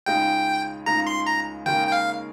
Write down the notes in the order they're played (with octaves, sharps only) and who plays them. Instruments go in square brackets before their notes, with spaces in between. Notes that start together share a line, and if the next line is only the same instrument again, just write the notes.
[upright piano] C#2 C#3 G#3 D#4 [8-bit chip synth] G5
[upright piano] C#2 C#3 G#3 D#4 [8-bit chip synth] A#5
[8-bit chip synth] C6
A#5
[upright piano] D#2 C#3 G#3 D#4 A#4 [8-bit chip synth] G5
[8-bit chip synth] G5
F5